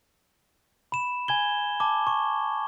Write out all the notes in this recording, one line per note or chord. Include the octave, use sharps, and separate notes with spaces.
B5 E7
G#5 G#6 G7
A5 D6
C#6